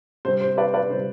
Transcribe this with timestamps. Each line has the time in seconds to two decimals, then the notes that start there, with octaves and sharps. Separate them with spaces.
0.25 C3 G3 C4 C5
0.41 C5
0.57 B4 D5
0.74 B4 D5
0.90 C3 G3 C4 C5